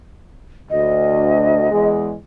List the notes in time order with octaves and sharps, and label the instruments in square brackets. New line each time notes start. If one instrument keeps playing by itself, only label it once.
[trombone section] D2 [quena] D#5
[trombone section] E2 G#3